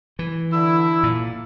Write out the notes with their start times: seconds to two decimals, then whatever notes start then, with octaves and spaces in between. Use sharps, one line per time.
0.19 E3
0.52 D3 E4
1.03 A#2